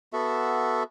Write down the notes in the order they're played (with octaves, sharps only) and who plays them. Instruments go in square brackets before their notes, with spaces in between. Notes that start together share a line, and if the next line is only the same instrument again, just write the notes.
[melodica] B3 F#4 A4 E5